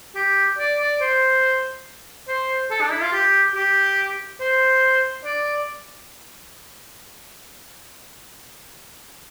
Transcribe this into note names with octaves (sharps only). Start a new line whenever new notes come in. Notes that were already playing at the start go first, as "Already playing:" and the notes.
G4
D5
D5
C5
C5
A4
D4
E4
F4
G4
G4
C5
D5